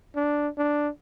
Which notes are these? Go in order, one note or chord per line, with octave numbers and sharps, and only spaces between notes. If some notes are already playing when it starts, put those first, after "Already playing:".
D4
D4